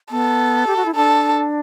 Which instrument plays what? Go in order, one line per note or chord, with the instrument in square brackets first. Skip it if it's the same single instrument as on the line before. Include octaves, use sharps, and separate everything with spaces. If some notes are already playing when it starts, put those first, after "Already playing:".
[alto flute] B3 [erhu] A4
[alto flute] G4
F#4
E4
[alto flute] D4 [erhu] A4